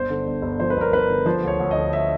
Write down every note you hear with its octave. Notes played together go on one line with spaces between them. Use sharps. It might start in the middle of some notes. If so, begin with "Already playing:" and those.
Already playing: G1 C5
D3
G1
G1
F3 C5
B4
G1 A#4
G1 B4
D3
F3 C5
D2 C#5
D2
D#5
D3
E5